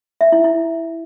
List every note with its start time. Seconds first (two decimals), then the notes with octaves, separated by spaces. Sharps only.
0.21 E5
0.32 E4
0.44 E4